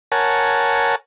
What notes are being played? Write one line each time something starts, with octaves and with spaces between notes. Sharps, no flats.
A#4 C#5 F#5 G#5 A5